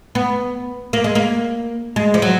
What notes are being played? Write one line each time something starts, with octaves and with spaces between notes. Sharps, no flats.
B3
A#3
G#3
A#3
G#3
F3
F#3